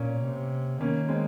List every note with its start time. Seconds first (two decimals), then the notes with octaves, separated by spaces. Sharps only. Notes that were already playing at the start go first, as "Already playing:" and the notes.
Already playing: A#2 A#3 C#4
0.22 C3
0.81 D#3 A#3 C#4
1.08 G#3 C4